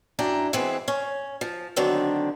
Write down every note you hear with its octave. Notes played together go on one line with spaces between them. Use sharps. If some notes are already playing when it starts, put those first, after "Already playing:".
F#2 D4 E4 G5 A#5
E3 G#3 B3 C4
C#4
F3
D3 D#3 F#3 B3 C4 D4